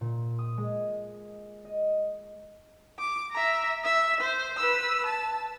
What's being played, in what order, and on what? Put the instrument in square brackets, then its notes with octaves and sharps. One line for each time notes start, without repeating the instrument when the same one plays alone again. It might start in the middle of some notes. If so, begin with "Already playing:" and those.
[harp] A#2
D#6
G#3
D#5
[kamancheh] D6
E5 A#5
E5
C5
B4 E6
A5